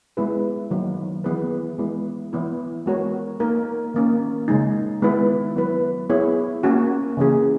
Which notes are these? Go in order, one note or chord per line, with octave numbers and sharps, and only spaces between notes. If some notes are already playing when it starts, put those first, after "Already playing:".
G#3 B3 E4 G#4 B4
D#3 F#3 A#3
E3 B3 E4 G#4 B4
G#3 B3 E4
E3 B3 E4
G#3 B3 F#4 A#4 C#5
A#3 D#4 A#4
D#3 A#3 C#4
C#3 G#3 D#4
D#3 G#3 B3 E4 B4
F#3 B3 E4 B4
B3 E4 G#4 C#5
A#3 C#4 F#4
C#3 E3 A#3 C#4 G#4